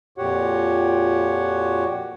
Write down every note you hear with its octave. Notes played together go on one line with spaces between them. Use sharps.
F2 A#2 F#4 G4 C#5 F#5